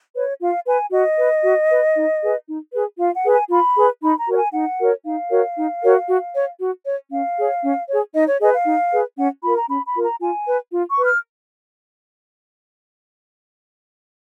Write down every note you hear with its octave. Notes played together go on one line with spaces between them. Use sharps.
B4 C#5
F4 F5
B4 G#5
F#4 D#5
B4
F#4
B4
D#4
G#4 B4
D#4
G#4 B4
F4 F5
F#5
G#4 B4
G#5
F4 B5
G#4 B4
D#4 B5
A#5
F#4 A#4 C#5
G#5
D#4 F#5
F#4 A#4 C#5
D#4 F5
F#4 A#4 C#5
D#4
F#4 A#4 C#5
F#4
C#5
F#4
C#5
C#4 F5
G#4 C#5
C#4
G#4 C#5
D#4 D#5
C#5
G#4 B4 D#5
F5
D#4
G#4 B4
C#4 F#5
F4 A#4 B5
A#5
C#4 B5
B5
F4 A#4
A#5
F4 G#5
B4
F4
C#6
B4
F6